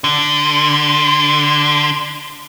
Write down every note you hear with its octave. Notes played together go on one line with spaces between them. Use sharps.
D3